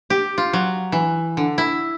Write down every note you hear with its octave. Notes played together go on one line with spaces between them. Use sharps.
G4
F4
F#3
E3
D3
E4